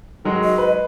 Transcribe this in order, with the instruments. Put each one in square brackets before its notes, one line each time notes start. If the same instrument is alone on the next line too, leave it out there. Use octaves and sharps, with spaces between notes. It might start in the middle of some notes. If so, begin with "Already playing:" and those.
[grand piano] D#3 F#3 G#3
[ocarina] D#5
[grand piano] B4